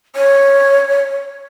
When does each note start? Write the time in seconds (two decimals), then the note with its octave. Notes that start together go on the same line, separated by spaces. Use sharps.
0.15 C#5